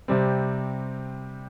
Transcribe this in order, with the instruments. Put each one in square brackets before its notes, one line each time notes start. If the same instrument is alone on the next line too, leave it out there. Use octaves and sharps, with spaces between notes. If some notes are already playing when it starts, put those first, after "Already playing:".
[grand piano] C3 G3 C4